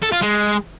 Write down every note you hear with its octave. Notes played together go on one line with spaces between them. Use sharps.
A4
F4
G#3